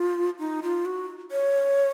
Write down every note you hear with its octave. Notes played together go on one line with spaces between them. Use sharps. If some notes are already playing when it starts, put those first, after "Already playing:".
Already playing: F4
D#4
F4
F#4
C#5